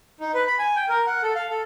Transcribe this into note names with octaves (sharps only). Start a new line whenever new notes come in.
D#4
B4
B5
G#5
G5
A#4
F#5
A4
F5
A4